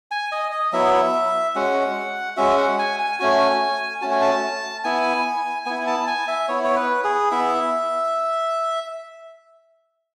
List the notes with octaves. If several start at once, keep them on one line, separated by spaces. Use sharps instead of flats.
G#5
D#5
D#5
F#3 B3 E4 E5
G#3 C#4 F#4 F#5
G#3 C#4 F#4 E5
F#5
G#5
G#5
A3 C#4 F#4 G#5
A3 C#4 F#4 A5
G#5
A5
B3 E4 G#5
B3 E4 G#5
A5
G#5
E5
B3 E4 C#5
C#5
B4
G#4
B3 E4 E5